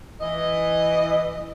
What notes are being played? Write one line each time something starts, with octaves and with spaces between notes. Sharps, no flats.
E3 D#5